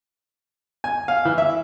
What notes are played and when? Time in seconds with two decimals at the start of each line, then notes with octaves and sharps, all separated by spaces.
0.84 G#5
1.08 F5
1.25 E3
1.38 E5